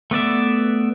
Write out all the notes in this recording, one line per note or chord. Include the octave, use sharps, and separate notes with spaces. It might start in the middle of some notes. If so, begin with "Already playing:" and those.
A3 B3 D5 E5